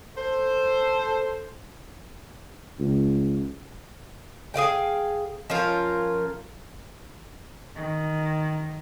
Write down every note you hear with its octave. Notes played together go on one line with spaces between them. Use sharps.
A4 C5
C#2
G#4 B4 F5 G5
F3 C#4 F4 A#4
D#3